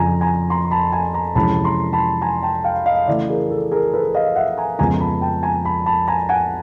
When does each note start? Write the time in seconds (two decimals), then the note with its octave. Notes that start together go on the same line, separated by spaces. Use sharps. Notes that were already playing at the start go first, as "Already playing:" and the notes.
Already playing: F2 C#3 F3 G#5 A#5
0.21 G#5 A#5
0.50 A#5 C6
0.65 C6
0.71 A5 B5
0.92 G#5 A#5
1.14 G#5 A#5
1.35 F2 C3 E3 G#3 C#4 A5 B5
1.64 A#5 C6
1.93 A5 B5
2.22 G#5 A#5
2.43 G5 A5
2.64 F5 G5
2.86 D#5 F5
3.07 C#3 E3 A3 D5 E5
3.29 G#4 A#4
3.51 A4
3.71 G#4 A#4
3.93 A4 B4
4.14 D#5 F5
4.36 E5 F#5
4.58 G#5 A#5
4.78 F2 C#3 F3 G#3 B3 G#5 A#5
5.00 A5 B5
5.21 G5 A5
5.43 G#5 A#5
5.65 A5 B5
5.86 A5 B5
6.07 G#5 A#5
6.29 F#5 G#5